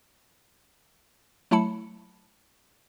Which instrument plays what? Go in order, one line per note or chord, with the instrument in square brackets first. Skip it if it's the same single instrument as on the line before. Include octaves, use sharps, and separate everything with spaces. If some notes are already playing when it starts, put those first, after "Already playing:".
[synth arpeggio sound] F#3 A3 E4 A5 B5 C#7